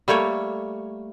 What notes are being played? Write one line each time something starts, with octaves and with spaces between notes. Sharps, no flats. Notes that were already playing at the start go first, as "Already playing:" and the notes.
G3 A3 A#3 C#5